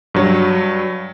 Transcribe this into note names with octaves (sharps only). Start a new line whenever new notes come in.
G2 F#3